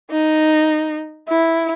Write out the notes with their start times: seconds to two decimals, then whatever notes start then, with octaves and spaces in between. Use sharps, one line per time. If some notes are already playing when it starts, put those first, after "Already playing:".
0.11 D#4
1.29 E4